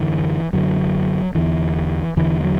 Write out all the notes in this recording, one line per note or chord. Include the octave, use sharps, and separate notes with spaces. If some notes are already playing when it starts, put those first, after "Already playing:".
Already playing: F#2 D3 E3
F#2 D3 F#3
E2 D3 E3
E2 D3 E3
G3
F#3